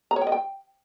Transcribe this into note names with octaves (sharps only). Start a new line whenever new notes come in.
A#5
C#5
G5
D#5
G5